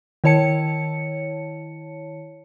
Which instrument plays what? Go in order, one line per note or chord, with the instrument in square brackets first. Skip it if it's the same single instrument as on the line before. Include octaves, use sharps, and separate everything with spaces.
[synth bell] D#3 E4 C#5 A5 C#7